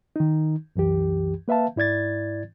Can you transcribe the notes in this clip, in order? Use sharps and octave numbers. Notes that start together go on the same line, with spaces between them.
D#3 D#4
C2 F#2 E3 G4
A#3 B4 E5 F5 A5
G#2 E4 D5 G#6 A6